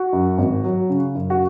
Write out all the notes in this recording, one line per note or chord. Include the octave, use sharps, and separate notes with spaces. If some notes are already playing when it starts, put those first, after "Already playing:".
Already playing: F#4
F#2
G#1
F#3
C#3
F#2
F#4